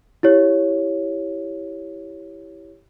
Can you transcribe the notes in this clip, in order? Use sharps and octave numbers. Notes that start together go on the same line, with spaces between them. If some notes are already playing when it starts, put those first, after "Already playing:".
E4 G4 C#5